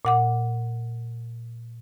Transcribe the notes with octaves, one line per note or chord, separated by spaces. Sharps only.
A#2 F#5 D6